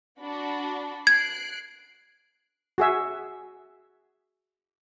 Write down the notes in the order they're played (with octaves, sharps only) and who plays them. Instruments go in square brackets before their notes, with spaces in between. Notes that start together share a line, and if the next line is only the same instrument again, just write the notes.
[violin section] D4 F#4 B5
[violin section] F#6 C7 D7 [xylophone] G#6
[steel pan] F#4 G#4 E5